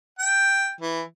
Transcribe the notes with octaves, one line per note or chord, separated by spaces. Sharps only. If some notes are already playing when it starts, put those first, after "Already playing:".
G5
E3